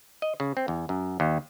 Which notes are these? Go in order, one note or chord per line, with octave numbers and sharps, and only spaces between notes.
D#5
C#3
C4
E2
F#2
D#2